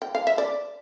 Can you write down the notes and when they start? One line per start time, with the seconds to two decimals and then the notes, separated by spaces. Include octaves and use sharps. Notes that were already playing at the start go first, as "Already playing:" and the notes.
0.02 G5
0.15 F5
0.27 E5
0.38 D5